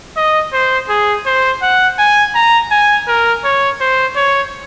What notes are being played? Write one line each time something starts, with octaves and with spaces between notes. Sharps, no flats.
D#5
C5
G#4
C5
F#5
G#5
A#5
G#5
A#4
C#5
C5
C#5